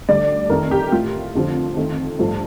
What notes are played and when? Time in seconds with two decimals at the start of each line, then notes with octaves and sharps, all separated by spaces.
0.09 D2 D3 G3 D5
0.50 F2 D#3 A3 A#4
0.71 G4
0.92 A2 A3 F4
1.35 F2 D3 F3
1.77 F2 D#3 A3
2.19 G2 F3 A3